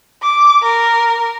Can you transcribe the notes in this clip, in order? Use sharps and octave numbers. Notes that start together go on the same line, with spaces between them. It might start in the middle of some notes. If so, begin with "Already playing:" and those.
D6
A#4